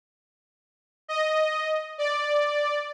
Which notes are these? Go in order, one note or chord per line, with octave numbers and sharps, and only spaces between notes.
D#5
D5